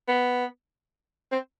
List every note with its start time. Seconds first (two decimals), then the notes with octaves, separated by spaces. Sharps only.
0.08 B3
1.32 C4